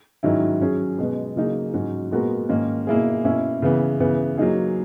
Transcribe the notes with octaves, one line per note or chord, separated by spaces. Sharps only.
G#2 D#3 F#3 C#4 E4
F#3 C#4 G#4
B2 G#3 B3
C#3 F#3 A#3 D#4 G#4
G#2 F#3 C#4 F#4
A#2 G#3 B3 F#4 A#4
G#2 D#3 A#3 C#4
B2 A#3 E4 G#4
B2 A#3 C#4 E4
C#3 E3 B3
C#3 E3 B3
F#3 A#3 D#4 G#4